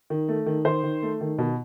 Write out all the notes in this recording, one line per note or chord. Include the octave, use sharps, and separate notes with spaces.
D#3
A3
D#3
D#3 C5
D#3
A3
D#3
B2